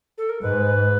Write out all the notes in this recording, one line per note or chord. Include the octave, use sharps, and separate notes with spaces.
A4
A#4
G#2 B4